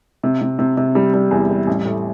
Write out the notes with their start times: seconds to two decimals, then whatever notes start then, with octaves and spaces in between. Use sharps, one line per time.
0.23 C3
0.41 C3
0.59 C3
0.77 C3
0.95 G3
1.14 G3
1.31 E2
1.49 G3
1.67 A1
1.85 A2